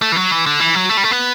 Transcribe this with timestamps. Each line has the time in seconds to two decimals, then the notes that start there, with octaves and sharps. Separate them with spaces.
0.02 A3
0.12 E3
0.16 F#3
0.31 E3
0.46 D3
0.60 E3
0.75 F#3
0.90 A3
0.97 G3
1.04 A3
1.11 B3